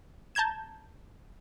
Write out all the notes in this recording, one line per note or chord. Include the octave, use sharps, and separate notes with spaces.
A5 A#5 G6 G#6 E7